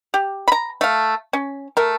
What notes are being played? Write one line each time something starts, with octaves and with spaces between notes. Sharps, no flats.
G4
A#5 B5
A3 F5
C#4
A3 A#4